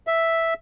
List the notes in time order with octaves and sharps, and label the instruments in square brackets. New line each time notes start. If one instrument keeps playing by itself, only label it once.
[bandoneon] E5